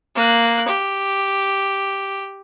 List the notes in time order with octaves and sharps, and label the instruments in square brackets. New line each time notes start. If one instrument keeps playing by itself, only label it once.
[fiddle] A#3 F#6
G4